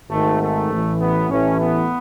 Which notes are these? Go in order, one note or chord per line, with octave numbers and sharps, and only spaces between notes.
G#1 G#2 D#3 A3
A3
A1 A2 E3
B3
A1 A2 E3 C#4
B3